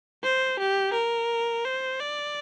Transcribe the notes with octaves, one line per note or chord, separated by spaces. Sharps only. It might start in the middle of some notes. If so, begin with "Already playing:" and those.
C5
G4
A#4
C5
D5